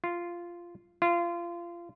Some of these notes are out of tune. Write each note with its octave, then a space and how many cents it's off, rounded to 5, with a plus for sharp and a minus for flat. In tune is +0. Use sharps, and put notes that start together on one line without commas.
F4 -10
F4 -25